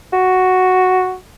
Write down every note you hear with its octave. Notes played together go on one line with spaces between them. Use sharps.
F#4